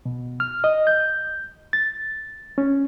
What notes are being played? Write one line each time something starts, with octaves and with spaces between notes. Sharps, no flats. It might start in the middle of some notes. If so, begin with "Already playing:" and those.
B2
F6
D#5
G6
A6
C#4